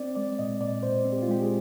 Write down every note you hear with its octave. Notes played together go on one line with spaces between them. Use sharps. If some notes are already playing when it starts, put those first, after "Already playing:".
Already playing: C4 D5
G#3 D5
A#2 D#5
A#2 D5
A#2 C5
C4
G4
F4
G#3 G4
G#4